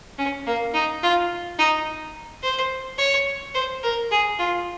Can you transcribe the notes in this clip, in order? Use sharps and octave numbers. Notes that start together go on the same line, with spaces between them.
C#4
A#3
D#4
F4
D#4
C5
C#5
C5
A#4
G#4
F4